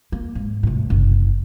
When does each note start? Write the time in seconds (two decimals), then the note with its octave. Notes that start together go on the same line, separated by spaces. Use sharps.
0.12 A#3
0.35 G#2
0.63 C2 A2
0.90 F#1